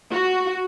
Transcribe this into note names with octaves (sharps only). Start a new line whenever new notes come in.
F#4